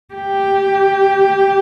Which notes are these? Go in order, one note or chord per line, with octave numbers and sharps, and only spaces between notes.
G4